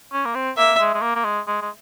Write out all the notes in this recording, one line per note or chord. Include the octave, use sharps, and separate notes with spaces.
C#4
A#3
C4
A#3 E5
G#3
G#3
A#3
A#3
G#3
G#3
G#3